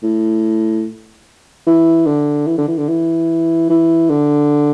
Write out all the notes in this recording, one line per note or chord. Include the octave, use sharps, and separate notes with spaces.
A2
E3
D3
E3
D3
E3
D3
E3
E3
D3